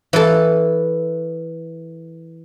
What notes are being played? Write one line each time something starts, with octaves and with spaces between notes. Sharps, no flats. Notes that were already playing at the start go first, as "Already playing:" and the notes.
E3 A4